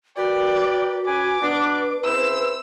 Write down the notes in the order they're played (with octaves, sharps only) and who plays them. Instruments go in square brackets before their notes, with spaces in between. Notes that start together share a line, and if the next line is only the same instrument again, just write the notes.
[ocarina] F#4 [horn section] A#4 B4 G5 [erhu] D5
[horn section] C#4 B4 G#5 [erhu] D6
[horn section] B2 B3 D4 [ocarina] B4
[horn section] C#3 C4 E4 [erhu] E6